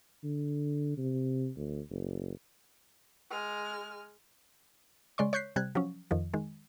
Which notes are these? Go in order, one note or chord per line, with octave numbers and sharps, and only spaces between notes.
D3
C3
D2
F#1
G#3 F6
C#3 G#3 D5 C6 C#6
C#5 C#6 F#6 G6 B6 C7
C3 G3 F#6 G#6
F3 F#3 C#4
F2 D#3 F3
D#3 G#3